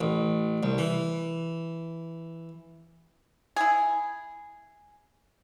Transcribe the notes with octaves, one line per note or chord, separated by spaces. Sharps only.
A1
C2
E3
E4 G#4